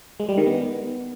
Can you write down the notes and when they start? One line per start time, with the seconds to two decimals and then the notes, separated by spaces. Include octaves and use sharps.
0.20 G#3
0.29 G3
0.38 D#3
0.47 B3